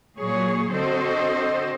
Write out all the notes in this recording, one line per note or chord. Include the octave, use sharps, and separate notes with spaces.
A#2 F#3 G#4 C#5
D3 C4 F#4 A4 C5 D#5